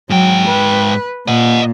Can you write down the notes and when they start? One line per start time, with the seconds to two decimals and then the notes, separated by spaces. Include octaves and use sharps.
0.10 G#2 F#3 G5
0.48 B4
1.28 A#2 D#5 F#5